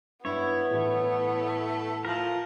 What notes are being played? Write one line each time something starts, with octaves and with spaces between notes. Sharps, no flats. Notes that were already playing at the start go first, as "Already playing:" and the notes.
G2 B3 E4 C#5
A2 E3 A3
F3 A#4